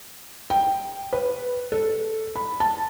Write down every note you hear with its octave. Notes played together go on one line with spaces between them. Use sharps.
G5
B4
A4
B5
A5